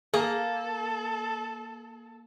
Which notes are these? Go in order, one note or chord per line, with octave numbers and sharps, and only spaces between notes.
A#3 G#4 A4